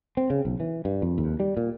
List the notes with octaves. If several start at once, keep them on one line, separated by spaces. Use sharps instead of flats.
C4
C#3
B1
E3
G2
F2
D#2
G3
A#2